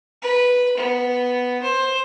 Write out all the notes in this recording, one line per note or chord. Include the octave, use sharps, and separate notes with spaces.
B4
B3
C5